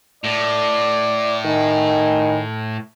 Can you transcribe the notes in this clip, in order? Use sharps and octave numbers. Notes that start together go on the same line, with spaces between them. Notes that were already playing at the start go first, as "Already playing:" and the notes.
A2 D5
D#3 G#5